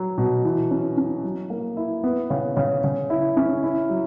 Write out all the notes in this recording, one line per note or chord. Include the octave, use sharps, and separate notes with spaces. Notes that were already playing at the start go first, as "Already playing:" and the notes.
Already playing: F#3
B2
E3
C#4
C#4
F#3
A#3
E4
B3
C#3
C#3
C#3
E4
C#4
E4
F#3